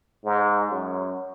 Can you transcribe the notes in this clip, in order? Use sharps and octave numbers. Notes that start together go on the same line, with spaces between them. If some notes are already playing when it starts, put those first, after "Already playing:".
G#2
F#2